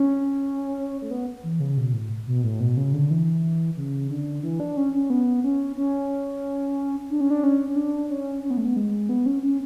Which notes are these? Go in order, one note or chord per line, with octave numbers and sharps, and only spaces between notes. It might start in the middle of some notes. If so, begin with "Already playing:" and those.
Already playing: C#4
A3
B3
E3
C#3
B2
A2
B2
A2
B2
C#3
D3
E3
C#3
D3
E3
D4
C#4
C#4
B3
C#4
C#4
D4
C#4
D4
C#4
C#4
D4
C#4
C#4
B3
A3
B3
G#3
B3
C#4
C#4